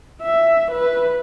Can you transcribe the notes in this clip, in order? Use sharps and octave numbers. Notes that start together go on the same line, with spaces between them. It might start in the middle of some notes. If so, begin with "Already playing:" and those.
E5
B4